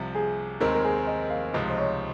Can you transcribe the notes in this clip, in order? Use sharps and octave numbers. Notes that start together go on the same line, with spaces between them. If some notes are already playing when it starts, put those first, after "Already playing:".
Already playing: C2 C3 F3
G#4
D#2 D#3 G#3 C4 D#4 A#4
A#4
G#4
D#5
F5
C#2 C3 F3 G#3 D#4 D#5
C5
C#5